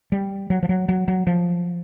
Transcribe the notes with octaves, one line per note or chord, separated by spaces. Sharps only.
G3
F#3
F3
F#3
F#3
F#3
F3